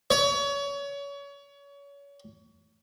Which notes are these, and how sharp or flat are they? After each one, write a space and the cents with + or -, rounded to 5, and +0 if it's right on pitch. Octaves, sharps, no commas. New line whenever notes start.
C#5 +30